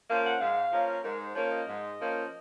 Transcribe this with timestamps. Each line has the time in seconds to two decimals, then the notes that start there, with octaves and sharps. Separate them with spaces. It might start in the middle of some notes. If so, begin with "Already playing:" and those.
0.09 F3 A#3 C#4 F5
0.25 F#5
0.40 G#2 F5
0.72 F3 A#3 C#4
1.03 G#2 A#4
1.20 C5
1.35 F3 A#3 C#4 C#5
1.52 D#5
1.67 G#2
1.99 F3 A#3 C#4